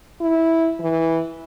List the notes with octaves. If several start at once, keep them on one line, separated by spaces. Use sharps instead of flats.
E4
E3